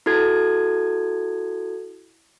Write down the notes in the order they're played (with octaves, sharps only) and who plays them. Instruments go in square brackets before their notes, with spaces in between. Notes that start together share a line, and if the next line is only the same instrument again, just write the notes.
[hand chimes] E4 F#4 A4 G#6